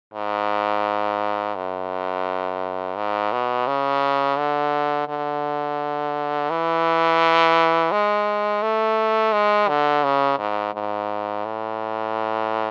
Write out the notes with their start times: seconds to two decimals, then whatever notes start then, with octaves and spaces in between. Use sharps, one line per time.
0.14 G#2
1.55 F#2
2.97 G#2
3.32 B2
3.67 C#3
4.37 D3
5.08 D3
6.50 E3
7.92 G#3
8.62 A3
9.33 G#3
9.68 D3
10.04 C#3
10.38 G#2
10.74 G#2
11.45 A2